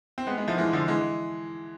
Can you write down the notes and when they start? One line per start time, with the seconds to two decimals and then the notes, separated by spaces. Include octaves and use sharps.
0.18 C4
0.27 G#3 B3
0.37 G#3 B3
0.47 F3 A3
0.57 E3 G#3
0.73 D3 F3
0.88 E3 G#3